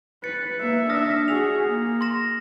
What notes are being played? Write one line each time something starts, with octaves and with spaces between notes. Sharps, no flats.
B4 A6 C#7
A#3 E5
D4 E5 D#6 F6 A#6
F#4 G#4 F7
A#3
C6 A#6 E7